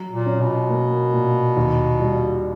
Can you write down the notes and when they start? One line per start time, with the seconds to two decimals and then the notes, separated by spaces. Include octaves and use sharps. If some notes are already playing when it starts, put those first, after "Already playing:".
Already playing: F#3
0.11 A#2
0.26 C#4
0.40 B2
0.69 A#3
1.13 A#2
1.56 D#2
2.00 G3